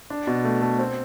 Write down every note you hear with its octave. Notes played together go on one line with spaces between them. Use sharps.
D4
B2
A3
A3
C4